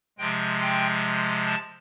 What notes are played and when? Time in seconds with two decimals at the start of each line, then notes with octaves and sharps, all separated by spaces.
0.18 C3 F3 G#3 G5
0.61 G5
1.46 A5